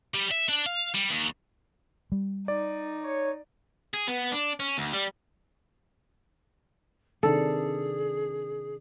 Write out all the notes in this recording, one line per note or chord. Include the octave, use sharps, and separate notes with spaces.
G3
E5
D4
F5
G3
D#2
G3
D#4 D5
C#5
G#4
B3
D4
C#4
D2
G3
C3 D#3 D4 G#4 A4